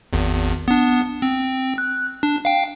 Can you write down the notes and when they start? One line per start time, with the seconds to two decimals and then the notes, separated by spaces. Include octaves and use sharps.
0.13 G#1 E2
0.68 B3 D4
1.22 C4
1.78 F#6
2.23 D4
2.45 F5 G5